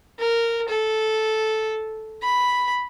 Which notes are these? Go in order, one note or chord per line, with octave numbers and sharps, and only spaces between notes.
A#4
A4
B5